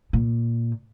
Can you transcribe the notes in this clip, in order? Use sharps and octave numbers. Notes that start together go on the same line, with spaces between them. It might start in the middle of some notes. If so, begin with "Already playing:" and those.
A#2